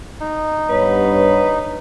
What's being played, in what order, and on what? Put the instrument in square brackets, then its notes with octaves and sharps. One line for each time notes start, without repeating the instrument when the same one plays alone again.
[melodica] D#4
[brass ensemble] G2 B3 C#5 [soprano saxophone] B4